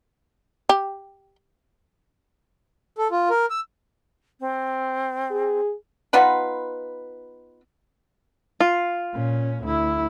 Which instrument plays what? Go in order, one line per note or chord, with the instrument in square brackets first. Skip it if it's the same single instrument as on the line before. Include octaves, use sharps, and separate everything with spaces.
[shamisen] G4
[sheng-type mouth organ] A4
F4
A#4
E6
[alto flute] C4
[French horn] G#4
[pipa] B3 D#4 F4 B4
[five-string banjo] F4
[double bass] A#2 C#4
D2 E4